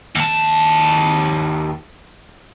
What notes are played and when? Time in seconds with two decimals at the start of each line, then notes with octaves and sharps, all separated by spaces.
0.15 D#2 A5